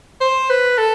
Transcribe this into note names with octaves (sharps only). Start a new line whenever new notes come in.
C5
B4
A4